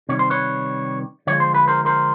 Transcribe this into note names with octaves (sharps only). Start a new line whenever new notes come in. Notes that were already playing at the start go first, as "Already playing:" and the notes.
C3 D#3 G3 C#5
C5
B4 C#5
D3 F3 G#3 C#5
C5
B4
A#4 C5
A#4 C5